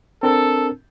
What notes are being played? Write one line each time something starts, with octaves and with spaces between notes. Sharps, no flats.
C4 D4 A4 A#4